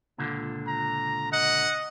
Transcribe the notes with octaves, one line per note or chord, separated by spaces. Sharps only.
C#2 A#2 D3
A#5
D#5 F#5